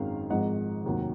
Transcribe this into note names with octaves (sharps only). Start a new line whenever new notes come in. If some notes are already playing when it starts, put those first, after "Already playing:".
Already playing: G#1 F#2 D#3 G#3 F5
G#1 G#2 F3 G#3 D#5 F#5
F1 D#2 D#3 F#3